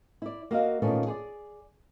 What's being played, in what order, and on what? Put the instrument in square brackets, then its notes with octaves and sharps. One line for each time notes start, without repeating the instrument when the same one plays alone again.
[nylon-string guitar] E4 D5
A#3 F#4 D#5 F5
A#2 D#3 E3 A3 B3 C#4
G#4 C5 D5